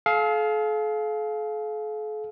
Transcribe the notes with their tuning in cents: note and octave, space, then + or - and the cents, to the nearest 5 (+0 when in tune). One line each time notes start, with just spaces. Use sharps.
A4 -45 F5 +5